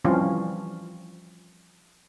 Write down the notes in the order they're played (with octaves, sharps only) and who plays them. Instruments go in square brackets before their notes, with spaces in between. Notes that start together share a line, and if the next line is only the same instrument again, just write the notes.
[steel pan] E3 F3 G3 C4 C#4 F4